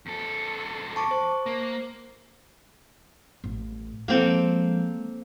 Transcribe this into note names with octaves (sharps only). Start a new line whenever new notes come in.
E2 A4
A5 C#6 D6
C5
A#3
A1
F3 G#3 A#3 C4 A4